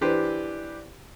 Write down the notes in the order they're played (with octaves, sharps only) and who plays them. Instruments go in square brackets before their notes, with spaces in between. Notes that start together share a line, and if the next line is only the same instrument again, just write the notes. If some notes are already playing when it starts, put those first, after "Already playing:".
[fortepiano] E3 D4 G4 B4 C5